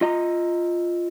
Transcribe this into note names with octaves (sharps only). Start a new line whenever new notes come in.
F4 D#5 A#5